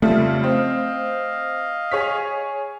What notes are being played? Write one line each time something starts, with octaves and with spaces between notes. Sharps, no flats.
F2 C#3 G3 A3
C4 D#5 F5
G#4 C#5 B6